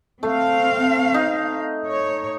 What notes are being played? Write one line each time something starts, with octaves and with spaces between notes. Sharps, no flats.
A3 C4 F5
D#4
C#5